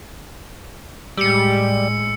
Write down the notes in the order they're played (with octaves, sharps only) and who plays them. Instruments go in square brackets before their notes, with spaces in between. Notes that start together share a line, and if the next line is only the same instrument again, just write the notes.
[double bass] A2 G#3 [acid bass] G3 [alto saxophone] G4 [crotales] E6 C#7